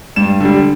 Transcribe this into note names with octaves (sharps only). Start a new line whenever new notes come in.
G2 E7
D3 G3